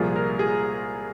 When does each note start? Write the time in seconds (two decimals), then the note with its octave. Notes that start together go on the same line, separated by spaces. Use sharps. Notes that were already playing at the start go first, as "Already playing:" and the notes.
Already playing: C2 A#2 F3 G#4
0.16 A#4
0.39 G#4